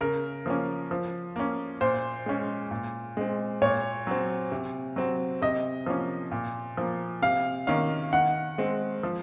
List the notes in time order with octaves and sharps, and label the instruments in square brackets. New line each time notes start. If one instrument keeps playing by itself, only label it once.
[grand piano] C#3 A#4
F3 A#3 C#4
F3
A#3 C#4
A#2 C5
G#3 C#4
A#2
G#3 C4
A#2 C#5
F#3 C4
C3
F#3 C4
C3 D#5
F3 A#3 C#4
A#2
F3 A#3
C3 F5
D#3 A#3 C#4 F5
D#3 F#5
G#3 C4
F3